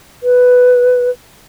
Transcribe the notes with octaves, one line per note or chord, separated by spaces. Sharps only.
B4